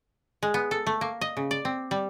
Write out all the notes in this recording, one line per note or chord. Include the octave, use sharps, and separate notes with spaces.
G#3
B3
A4
A3
A#3
D#5
C#3
D5
C4
G3